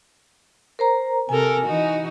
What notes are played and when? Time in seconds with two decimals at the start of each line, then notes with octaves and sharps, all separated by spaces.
0.79 A#4 C5 A#5
1.29 C3 A4 A#4 G#5
1.65 E3 D#4 F#4